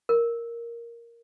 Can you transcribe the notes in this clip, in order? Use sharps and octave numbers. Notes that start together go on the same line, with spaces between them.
A#4